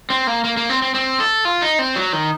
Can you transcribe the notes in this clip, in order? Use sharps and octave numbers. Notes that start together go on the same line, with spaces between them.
C4
A#3
A#3
A#3
C4
C4
C4
A4
F4
D#4
C4
F#3
D#3